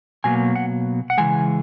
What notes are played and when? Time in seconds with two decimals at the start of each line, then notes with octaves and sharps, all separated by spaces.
0.24 B2 F#3 A#3 G#5
0.56 F#5
1.10 F#5
1.18 C#3 E3 G#3 G#5